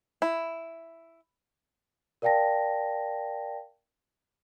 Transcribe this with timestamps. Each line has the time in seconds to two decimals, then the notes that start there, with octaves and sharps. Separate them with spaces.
0.22 E4
2.22 A#4 D5 F5 G5 A5 A#6